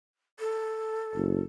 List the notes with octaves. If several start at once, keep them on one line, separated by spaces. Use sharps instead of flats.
A4
F#1